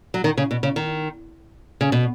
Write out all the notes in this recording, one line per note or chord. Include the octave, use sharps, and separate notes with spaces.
F#3
D#3
C#3
B2
C#3
D#3
C#3
B2